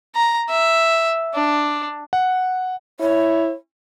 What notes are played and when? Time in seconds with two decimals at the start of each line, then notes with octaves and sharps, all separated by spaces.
0.16 A#5
0.50 E5
1.34 D4
2.13 F#5
3.00 E4 C#5